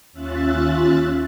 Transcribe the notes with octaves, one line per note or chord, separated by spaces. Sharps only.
D#2 C#4 F4 E5 F#6 A6